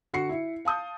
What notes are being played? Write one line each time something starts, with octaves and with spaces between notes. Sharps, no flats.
D3 F#4 F#5 C7 C#7
E4 E5
F5 A5 D#6 G6